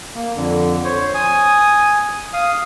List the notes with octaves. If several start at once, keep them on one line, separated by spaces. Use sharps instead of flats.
A#3
F2 D3
C5 C#5
G#5 D#6
F5 D#6